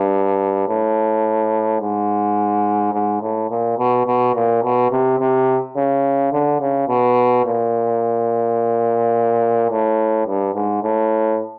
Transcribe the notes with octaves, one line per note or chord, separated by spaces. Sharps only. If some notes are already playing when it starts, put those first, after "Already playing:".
Already playing: G2
A2
G#2
G#2
A2
A#2
B2
B2
A#2
B2
C3
C3
C#3
D3
C#3
B2
A#2
A2
G2
G#2
A2